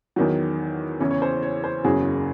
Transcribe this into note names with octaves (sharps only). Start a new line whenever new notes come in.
E2 D#3 F#3
E2 C#3 E3 C#5
C#5
C5
C#5
C#5
C5
F#1 E2 C#3 F#3 G#4